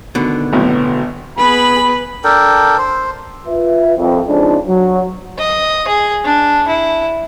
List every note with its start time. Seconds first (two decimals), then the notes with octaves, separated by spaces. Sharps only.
0.15 B2 D3 D#3
0.53 G#1 F#2 A2 B3
1.38 B3 G#4 B4 B5
2.24 D4 A4 A#4 G5
2.78 C5
3.47 F4 B4 E5
3.97 C2 F2
4.27 C#3 F3 G#3 C4 D4 D#4
4.68 F#3
5.39 D#5
5.88 G#4
6.25 D4
6.68 E4